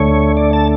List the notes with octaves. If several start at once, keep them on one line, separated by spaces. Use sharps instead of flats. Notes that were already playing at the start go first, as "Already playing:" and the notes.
Already playing: D2 D3 A3 C#5
D5
A5